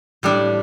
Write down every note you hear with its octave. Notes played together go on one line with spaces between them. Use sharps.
A2 G3 D4